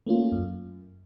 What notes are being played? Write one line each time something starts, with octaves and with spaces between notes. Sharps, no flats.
A3 A#3 C#4 F4
F#2